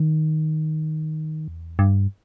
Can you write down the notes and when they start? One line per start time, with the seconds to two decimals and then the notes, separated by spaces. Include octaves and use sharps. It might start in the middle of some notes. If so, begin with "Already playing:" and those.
Already playing: D#3
1.48 E2
1.79 G2